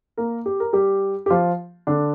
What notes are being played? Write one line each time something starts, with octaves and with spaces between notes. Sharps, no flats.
A#3 A#4
G4
A#4
G3 G4
G4
F3 F4
D3 D4